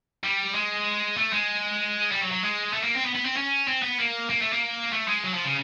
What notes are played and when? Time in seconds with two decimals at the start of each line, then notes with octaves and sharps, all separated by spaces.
0.24 G3
0.54 G#3
1.17 A3
1.33 G#3
2.12 G3
2.21 F#3
2.32 F#3
2.43 G#3
2.73 A3
2.83 A#3
2.94 C4
3.05 B3
3.15 B3
3.25 C4
3.37 C#4
3.68 C4
3.83 B3
3.99 A#3
4.30 A#3
4.42 A3
4.53 A#3
4.93 A3
5.08 G#3
5.24 F#3
5.34 F3
5.45 C#3